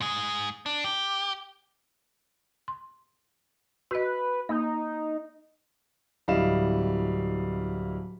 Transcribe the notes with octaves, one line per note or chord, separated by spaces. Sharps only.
G#2 G#4
D4
G4
C6
F#4 B4 D#5
A#3 D#4
D1 G3 E4 D#5 F5 E7